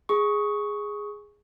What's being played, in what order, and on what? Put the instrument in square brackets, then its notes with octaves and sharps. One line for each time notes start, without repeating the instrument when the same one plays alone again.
[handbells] G#4 C#6